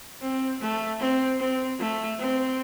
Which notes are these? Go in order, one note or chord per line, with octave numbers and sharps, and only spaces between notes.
C4
A3
C4
C4
A3
C4